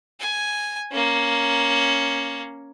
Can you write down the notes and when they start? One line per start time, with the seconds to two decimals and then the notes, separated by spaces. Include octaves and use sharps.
0.20 G#5
0.92 A#3 C#4